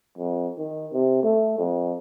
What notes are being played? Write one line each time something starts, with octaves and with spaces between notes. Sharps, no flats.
F2
D#3
C3
A3
F2